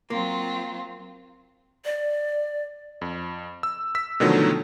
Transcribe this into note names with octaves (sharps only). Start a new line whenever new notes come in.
F#3 A#3 C4 F4
D5
F2
E6
E6 B6
B2 D3 D#3 F3 F#3 A3